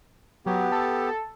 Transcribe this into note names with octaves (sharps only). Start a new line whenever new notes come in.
F#3 B3 G4
A4